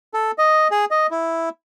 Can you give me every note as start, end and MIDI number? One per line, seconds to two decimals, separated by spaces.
0.14 0.31 69
0.38 0.68 75
0.71 0.85 68
0.91 1.07 75
1.11 1.49 64